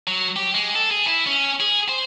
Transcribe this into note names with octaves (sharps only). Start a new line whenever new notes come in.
F#3
G4
G#3
A4
G#4
E4
C#4
G#4
C5